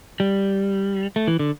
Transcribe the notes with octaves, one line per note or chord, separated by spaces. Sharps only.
G3
A3
E3
D3